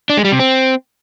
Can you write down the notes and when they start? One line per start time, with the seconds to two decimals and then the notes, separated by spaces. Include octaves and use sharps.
0.10 D4
0.17 G#3
0.25 G3
0.32 C3
0.40 C4